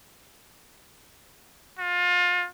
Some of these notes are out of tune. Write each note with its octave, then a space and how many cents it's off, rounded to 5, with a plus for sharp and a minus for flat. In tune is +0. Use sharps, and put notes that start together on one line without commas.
F4 +30